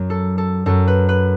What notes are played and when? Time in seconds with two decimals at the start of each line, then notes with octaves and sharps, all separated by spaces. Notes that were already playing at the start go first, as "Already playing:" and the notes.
Already playing: F#2 F#3
0.10 A4
0.38 A4
0.66 F#2 F#3 A4
0.87 B4
1.09 B4